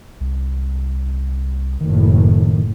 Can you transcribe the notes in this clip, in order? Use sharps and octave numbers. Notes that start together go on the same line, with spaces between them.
C2
F#1 A2 D#3